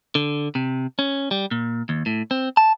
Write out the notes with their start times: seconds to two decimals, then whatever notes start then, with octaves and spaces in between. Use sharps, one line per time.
0.15 D3
0.55 C3
0.99 C#4
1.31 G3
1.51 A#2
1.89 D#2
2.06 A2
2.31 C4
2.57 A5